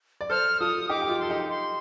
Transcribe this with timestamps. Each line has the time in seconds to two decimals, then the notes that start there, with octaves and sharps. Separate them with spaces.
0.21 D5
0.30 A4 C5 F6
0.60 F4 A4 D#6
0.89 D#4 G4 D6
1.02 G4
1.09 F4
1.20 A4 C6
1.30 D#4 G4
1.49 C6